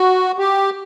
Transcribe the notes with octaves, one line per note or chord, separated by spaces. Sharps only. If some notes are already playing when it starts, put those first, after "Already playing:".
Already playing: F#4
G4